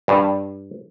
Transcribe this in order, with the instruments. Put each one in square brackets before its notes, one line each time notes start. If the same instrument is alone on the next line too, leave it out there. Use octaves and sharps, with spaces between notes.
[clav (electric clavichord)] G2